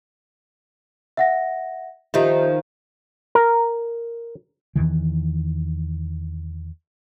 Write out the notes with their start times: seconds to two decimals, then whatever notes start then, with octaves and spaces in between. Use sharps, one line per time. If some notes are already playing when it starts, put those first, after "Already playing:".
1.17 E5 F#5 A#6
2.14 D#3 F3 D#4 F4 G4 E5
3.35 A#4
4.76 E2 C3 D#3 E3